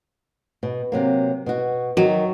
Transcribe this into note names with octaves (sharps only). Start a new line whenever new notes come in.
B2
C3 F#3 A#3
B2 F#4
D#3 F#3